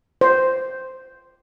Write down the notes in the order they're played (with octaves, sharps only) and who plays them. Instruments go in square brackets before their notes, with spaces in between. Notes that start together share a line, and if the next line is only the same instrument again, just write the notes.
[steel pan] C5